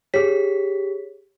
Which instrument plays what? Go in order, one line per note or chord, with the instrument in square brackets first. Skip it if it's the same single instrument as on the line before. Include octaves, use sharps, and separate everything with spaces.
[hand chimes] G4 B6 [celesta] G#4 C#5